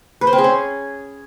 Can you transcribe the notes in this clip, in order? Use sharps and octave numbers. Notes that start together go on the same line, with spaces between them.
B4
C5
C4
G#4
C#4